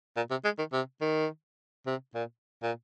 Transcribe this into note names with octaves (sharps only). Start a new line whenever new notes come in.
A#2
C3
G#3
D#3
C3
D#3
C3
A#2
A#2